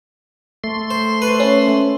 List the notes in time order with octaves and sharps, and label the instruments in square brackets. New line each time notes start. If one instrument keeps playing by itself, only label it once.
[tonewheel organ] A3 C6
[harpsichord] C5
B4 C5
[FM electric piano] C#4